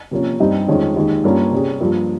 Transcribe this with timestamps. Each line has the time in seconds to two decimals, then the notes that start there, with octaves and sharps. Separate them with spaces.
0.11 C3 F3 A#3 C#4
0.39 G2 G3 C4 D#4
0.67 F2 D#3 G#3 C#4 F4
0.96 D#2 D#3 G#3
1.24 G2 G3 A#3 C#4 F4
1.51 C3 G3 C#4 G#4
1.80 G2 F3 A#3